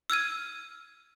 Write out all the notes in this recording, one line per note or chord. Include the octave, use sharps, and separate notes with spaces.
E6 F6 G#6 D#7